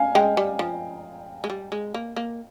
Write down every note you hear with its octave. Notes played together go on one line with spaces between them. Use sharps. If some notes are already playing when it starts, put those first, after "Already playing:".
Already playing: F5 G#5
G#3 D#5 G5
G3
F3
G#3
G3
G#3
A#3
A#3